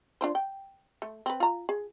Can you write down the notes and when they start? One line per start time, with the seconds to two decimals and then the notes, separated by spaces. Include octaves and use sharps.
0.21 D4 F4 C5
0.35 G5
1.02 A3
1.26 C4 B4
1.40 F4 A#5
1.69 G#4